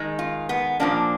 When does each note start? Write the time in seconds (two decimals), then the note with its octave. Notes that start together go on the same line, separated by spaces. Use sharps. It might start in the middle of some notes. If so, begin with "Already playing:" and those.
Already playing: D#3 G#3
0.19 F4
0.49 B3
0.80 A#2 F3 A#3 D4